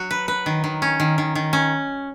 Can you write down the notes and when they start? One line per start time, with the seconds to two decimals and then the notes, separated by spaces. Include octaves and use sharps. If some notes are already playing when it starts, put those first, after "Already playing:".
Already playing: F#3 F#4
0.11 B4
0.28 B4
0.46 D#3
0.64 D#3
0.82 C#4
1.00 D#3
1.18 D#3
1.35 D#3
1.53 C#4